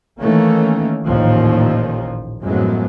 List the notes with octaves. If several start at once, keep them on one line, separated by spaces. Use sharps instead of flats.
D#3 E3 A3 A#3 C#4
A1 D#2 A#2 D#3 F3
F#2 A2 F3 F#3 G#3 B3